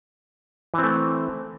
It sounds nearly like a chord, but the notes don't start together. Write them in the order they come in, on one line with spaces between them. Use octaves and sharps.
E3 C4 A3